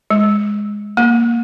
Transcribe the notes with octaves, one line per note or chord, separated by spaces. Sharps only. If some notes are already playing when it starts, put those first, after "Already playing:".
G#3
A#3